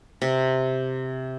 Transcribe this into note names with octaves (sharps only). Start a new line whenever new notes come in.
C3